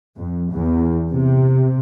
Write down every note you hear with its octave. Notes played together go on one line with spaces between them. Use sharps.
F2
E2
C3